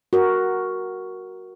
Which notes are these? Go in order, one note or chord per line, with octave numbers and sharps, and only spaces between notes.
F#4 A#4